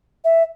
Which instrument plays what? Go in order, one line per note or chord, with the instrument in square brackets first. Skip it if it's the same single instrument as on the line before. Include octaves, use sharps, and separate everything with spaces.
[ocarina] E5